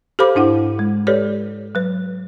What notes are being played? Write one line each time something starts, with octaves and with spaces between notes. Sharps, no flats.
G4 A4 C5 F5 B5 D6
G#2 D4 E4 F#5
G#3
G4 A4 B4 C#5 D5
F#3 B4